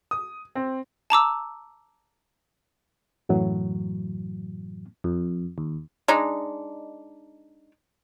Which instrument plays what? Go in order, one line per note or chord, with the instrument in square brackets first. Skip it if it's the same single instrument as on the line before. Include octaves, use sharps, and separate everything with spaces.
[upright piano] D#6
C4
[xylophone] A5 A#5 D6 E6
[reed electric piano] F#2 A2 E3 F#3
[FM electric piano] F2
D#2
[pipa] G#3 D4 D#4